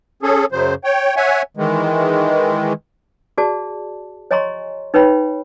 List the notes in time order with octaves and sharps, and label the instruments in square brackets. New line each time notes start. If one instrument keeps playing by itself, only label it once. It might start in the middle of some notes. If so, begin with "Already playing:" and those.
[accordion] C#4 G#4 A4
F#2 C#3 F#3 C5
C#5 G5
C#5 E5 F#5 G#5
D#3 E3 G#3
[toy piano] F#4 G#4 D5 A5
C#5 D#5 G#5 A#5 C6 C#6
D#4 B4 C#5 G5 B5